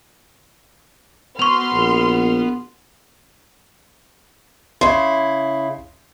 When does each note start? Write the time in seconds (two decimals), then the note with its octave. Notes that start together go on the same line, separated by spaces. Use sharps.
1.39 B3 F#4 B4 C6 C#6 F6 F7
1.72 A#1
4.81 C#3 E4 C6